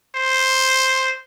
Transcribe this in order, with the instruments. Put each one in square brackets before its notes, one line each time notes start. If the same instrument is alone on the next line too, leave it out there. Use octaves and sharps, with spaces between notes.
[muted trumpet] C5